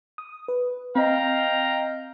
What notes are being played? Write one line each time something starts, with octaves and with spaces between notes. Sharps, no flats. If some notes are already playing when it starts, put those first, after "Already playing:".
D#6
B4
C4 D#5 F5 G5 A#5